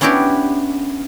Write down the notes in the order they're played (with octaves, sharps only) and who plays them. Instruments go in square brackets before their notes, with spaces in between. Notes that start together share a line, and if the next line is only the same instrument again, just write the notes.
[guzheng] B3 C#4 D4 E4 F#4 G4